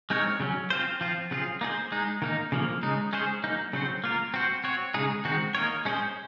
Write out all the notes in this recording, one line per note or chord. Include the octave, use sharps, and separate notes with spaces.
G#3 C4 D#4 A#4 C#5
C#3 F#3 C#4
C4 F4 C5
F3 C4 F4
C#3 F#3 C4 F4 G#4
A#3 D#4 G#4 C5
G#3 D#4 G#4
D#3 A#3 D#4
C#3 F3 A#3
C#3 G#3 D#4
G#3 C#4 G#4 C5
F#3 A#3 D#4
C#3 F#3 C4 F#4 C5
A#3 F4 A#4
C4 F#4 C5
C4 F#4 C#5
C#3 G#3 D#4 G#4
D#3 G#3 C4 D#4 F#4
A#3 D#4 A#4 C#5
G#3 C#4 G#4 C5